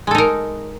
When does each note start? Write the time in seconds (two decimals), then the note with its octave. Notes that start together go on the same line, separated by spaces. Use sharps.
0.07 G#3
0.11 A4
0.15 D#4
0.18 A#4